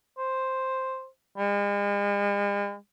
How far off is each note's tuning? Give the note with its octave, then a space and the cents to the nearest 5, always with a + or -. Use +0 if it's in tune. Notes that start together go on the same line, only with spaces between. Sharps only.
C5 +5
G#3 -45